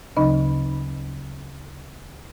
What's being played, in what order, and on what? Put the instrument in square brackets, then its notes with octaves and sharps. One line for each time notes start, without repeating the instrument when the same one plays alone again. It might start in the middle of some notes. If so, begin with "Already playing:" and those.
[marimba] D2 C#3 F#3 D#4 D#5 B5